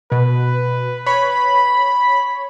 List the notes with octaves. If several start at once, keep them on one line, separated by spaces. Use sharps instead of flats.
B2 B4
C#5 B5